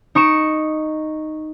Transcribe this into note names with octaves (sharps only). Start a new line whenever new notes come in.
D#4 C#6 D7 E7